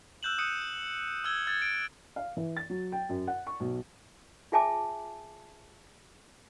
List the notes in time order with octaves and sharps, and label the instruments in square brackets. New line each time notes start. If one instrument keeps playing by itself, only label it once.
[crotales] E6 F#6 G6 E7 F#7
D#6 F#6 G6 C#7 D#7
E6 F6 G#6 G7
F6 G#6 A6
D7
[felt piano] F5
E3
A6
F#3
G5
F#2
F#5
C#6
B1
[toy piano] F4 G#4 E5 G#5 A5 D6